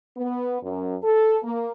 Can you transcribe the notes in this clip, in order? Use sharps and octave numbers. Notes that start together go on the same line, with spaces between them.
B3
F#2
A4
A#3